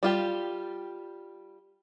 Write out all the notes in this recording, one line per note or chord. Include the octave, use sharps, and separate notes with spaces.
G3 F4 G4